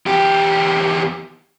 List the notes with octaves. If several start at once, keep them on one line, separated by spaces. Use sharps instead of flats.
E2 G4